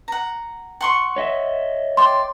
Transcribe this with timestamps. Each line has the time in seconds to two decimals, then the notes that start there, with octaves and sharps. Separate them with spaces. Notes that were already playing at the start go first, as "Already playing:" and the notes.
0.08 F#5 A#5
0.81 F#5 C6 C#6
1.16 C#5 D#5 E5
1.97 D5 G5 C6